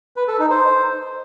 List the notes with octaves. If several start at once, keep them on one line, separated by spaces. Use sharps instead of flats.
B4
A4
D#4
C5